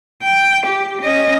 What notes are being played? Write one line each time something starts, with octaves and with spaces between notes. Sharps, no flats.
G5
G4
C#4 D#5